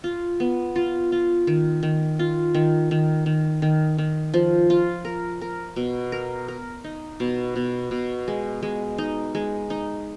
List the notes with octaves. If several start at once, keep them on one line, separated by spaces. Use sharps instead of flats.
F4
B3
F4
F4
D#3
D#3
F4
D#3
D#3
D#3
D#3
D#3
F3
F4
A#4
A#4
B2
A#4
A#4
D#4
B2
B2
B2
G#3
G#3
D#4
G#3
D#4